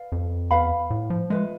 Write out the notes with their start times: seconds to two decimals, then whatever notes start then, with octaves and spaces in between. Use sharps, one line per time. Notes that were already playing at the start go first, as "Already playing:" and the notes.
Already playing: B4 D5 F5
0.12 F2
0.51 E2 B4 F5 B5
0.90 A2
1.10 F3
1.30 G#3 F4 B4 E5